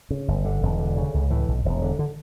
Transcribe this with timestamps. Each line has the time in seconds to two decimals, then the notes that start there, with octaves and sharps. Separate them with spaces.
0.10 C#3
0.28 G1
0.45 D3
0.63 E1
0.79 D3
0.97 C#3
1.14 C#2
1.30 A2 E3
1.48 B1
1.65 E1
1.82 D3
1.99 D3